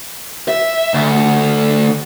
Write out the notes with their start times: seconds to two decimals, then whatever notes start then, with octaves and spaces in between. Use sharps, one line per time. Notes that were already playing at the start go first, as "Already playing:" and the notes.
0.48 E5
0.94 D2